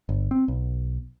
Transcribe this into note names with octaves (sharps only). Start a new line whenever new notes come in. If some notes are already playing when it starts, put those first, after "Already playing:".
G1
C4
B1